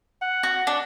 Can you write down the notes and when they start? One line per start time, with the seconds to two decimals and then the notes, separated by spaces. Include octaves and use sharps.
0.22 F#5
0.43 F#4
0.67 D4